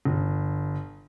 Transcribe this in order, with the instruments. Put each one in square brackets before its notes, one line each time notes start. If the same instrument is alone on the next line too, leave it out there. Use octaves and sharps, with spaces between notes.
[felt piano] G1